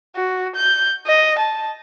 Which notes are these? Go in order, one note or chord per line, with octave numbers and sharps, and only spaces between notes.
F#4
G6
D#5
A5